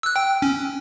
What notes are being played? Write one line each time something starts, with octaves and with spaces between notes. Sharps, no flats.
E6 F#6
G5
C#4